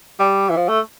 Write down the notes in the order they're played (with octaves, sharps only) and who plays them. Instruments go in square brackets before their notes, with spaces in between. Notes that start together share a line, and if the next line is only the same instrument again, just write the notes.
[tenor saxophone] G3
E3
F3
A3